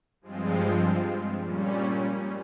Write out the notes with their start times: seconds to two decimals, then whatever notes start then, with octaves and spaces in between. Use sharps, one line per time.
0.21 G2 F3 G#3 C4 F4
1.38 A#2 G3 C#4